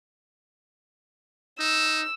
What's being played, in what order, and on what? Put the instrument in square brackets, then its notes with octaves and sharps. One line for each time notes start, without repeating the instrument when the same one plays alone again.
[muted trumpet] D#4 [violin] E6